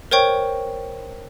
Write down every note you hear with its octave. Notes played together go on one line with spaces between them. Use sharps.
A#4 C5 C#5 G5 C#6